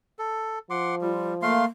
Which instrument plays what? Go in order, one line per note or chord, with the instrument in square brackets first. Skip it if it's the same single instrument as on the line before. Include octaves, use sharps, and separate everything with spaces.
[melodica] A4
[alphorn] F3 [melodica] F#5 C6 D6
[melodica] G3 [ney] F4
[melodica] A3 F5 C6 [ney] A#3